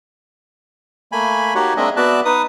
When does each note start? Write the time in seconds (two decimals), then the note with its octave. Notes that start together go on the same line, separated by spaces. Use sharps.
1.12 A3 A#3 G#5 B5
1.55 A#3 D#4 F#4 G4 C#5 F#5
1.77 G#3 A#3 C4 D4 D#5 E5
1.97 B3 F#4 D5 E5 A5 F#6
2.25 D#4 B4 D#6